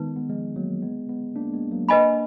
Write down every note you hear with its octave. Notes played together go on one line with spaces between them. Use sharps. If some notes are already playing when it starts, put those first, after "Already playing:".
Already playing: D#3 G#3 B3 D#4 B4
G#3 B3
F3 G#3
F#3 A#3
G#3 B3
G#3 B3
A#3 D4
G#3 B3
F#3 A#3
A#3 D4 B4 D#5 G#5 B5